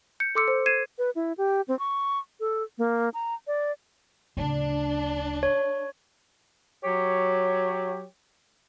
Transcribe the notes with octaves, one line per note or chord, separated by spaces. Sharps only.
G6 C#7
A4 C6 D6 E6 C#7
C5
G#6 C7 D#7 E7
B4
E4
G4
C4
C#6
A4
A#3
A#5
D5
D1 C#3 D4
C#5
F#3 G4 C#5